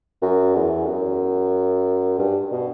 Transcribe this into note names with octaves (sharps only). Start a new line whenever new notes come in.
F#2
E2
F#2
G2
B2